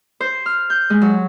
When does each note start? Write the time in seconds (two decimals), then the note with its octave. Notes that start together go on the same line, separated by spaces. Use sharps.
0.20 C5
0.46 F6
0.70 G6
0.90 G#3
1.02 F#3